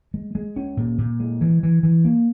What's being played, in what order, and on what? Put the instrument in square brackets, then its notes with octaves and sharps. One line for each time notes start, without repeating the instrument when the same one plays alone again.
[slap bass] G#3
G#3
C#4
A#2
A#2
G#3
E3
E3
E3
A#3